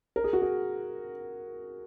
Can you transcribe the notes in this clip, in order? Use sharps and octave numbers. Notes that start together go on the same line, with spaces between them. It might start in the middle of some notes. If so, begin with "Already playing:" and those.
A#4
G#4
F#4
G#4